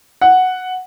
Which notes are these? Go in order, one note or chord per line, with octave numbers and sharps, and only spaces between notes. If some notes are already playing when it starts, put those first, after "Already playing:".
F#5